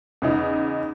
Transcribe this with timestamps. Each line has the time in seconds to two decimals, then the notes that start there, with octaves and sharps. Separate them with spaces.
0.22 E2 C#3 D#4